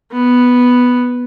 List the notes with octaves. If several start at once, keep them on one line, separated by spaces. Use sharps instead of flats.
B3